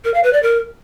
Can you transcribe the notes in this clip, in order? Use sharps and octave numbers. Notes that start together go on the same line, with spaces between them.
A#4
F5
B4
D5
A#4